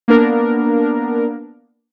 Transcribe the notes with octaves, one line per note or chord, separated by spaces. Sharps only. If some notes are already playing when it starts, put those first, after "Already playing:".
A#3 B3 D4 A#4